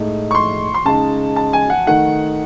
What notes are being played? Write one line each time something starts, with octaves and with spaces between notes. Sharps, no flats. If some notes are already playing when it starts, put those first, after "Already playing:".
Already playing: A2 G#3 D#4
C#6
C6
C6
C#3 G#3 D#4 A5
A5
G#5
F#5
D#3 A3 D#4 F#5